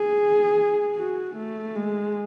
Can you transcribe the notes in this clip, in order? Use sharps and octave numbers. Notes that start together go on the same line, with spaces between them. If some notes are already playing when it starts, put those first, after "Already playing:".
Already playing: G#4
F#4
A3
G#3